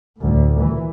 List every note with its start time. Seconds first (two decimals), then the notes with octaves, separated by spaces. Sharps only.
0.17 D2 A2
0.59 A#2 E3